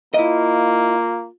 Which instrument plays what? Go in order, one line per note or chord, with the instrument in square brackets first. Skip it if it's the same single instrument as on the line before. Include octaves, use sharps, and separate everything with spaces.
[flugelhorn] A#3 [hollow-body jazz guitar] E4 D#5 [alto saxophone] F4